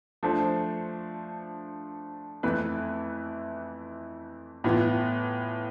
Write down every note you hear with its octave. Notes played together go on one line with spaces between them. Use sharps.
F3 A3 D4 A4 C5
F2 E3 A3 E4 B4
A2 E3 B3 F4